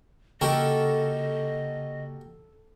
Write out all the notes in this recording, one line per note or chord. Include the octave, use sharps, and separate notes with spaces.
C#3 A#3 F#4 G4 A4 A#4 D#5